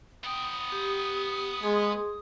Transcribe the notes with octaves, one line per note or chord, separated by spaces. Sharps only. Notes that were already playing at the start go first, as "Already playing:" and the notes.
B3 G5 D#6
G4
G#3 G#4 C6